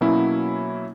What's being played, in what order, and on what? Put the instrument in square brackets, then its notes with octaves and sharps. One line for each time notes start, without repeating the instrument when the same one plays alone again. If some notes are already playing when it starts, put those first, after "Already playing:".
[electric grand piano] B2 F#3 A#3 C#4 E4